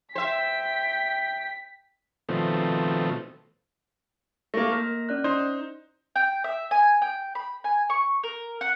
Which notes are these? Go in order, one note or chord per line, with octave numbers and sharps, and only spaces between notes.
C5 E5 G5 B6
B2 D#3 F3 A3 C4
A3 A#3 A#6
A#3 A#4 F6 A#6
C#4 D5 F#6
D#4 C5
G5
E5
G#5
G5
B5
G#5
C#6
A#4
F#5